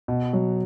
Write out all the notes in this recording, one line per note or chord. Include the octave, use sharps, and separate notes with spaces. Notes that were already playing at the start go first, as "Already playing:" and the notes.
B2
F#3